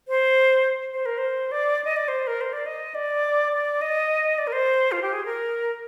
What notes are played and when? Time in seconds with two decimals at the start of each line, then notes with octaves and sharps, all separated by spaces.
0.08 C5
0.94 C5
1.06 A#4
1.18 C5
1.52 D5
1.85 D#5
1.96 D5
2.08 C5
2.27 A#4
2.41 C5
2.53 D5
2.66 D#5
2.95 D5
3.53 D5
3.81 D#5
4.38 D5
4.47 A#4
4.52 C5
4.92 F4
5.02 G4
5.13 G#4
5.25 A#4